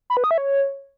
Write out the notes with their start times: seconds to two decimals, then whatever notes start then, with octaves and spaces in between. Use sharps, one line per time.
0.10 B5
0.17 B4
0.24 D#6
0.31 E5
0.38 C#5